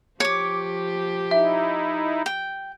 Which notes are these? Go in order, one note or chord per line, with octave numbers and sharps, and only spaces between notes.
F3 G4 C#5 D6
D#4 E4 E5
G5